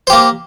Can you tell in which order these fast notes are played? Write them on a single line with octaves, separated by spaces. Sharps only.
C5 G4 A#3